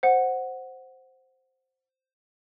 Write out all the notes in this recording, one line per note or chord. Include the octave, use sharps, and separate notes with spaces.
C5 F#5